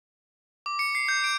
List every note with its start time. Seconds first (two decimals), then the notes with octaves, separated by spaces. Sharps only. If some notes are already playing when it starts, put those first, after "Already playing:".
0.66 D6
0.79 C#7
0.95 C7
1.08 G6
1.24 D7